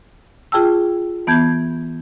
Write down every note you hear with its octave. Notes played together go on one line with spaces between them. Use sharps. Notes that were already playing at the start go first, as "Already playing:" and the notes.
F4 G#4 G5 A5 E6
E3 B3 A5 G6 G#6